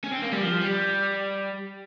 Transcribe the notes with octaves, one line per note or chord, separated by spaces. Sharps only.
C#4
C4
A#3
G3
F3
G3